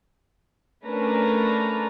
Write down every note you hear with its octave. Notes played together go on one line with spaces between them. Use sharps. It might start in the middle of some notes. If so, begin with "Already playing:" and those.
A3 C#4 D4 A#4 B4 A#5